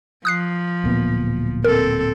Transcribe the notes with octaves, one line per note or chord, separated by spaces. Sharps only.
F3 D#6 F#6 C7
D1 A#2 B3
C4 A4 A#4